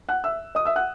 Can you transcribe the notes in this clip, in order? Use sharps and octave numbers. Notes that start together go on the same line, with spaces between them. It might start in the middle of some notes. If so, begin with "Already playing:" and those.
F#5 F#6
E5 E6
D#5 D#6
E5 E6
F#5 F#6